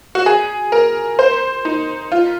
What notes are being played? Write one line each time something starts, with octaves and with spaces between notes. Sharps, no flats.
F#4
G#4
A#4
C5
D#4
F4